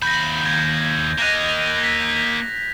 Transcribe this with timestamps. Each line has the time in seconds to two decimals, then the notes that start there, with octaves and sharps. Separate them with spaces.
0.02 D#2 B5 G6 A#6
0.46 G#6
1.18 A#3 D#5 F#6 A#6 F7
1.84 B6